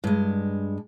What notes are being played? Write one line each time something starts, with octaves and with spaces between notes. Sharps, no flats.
G2 G#3